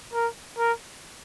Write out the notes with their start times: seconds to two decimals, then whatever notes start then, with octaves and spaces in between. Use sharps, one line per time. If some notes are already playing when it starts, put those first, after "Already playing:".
0.13 A#4
0.58 A#4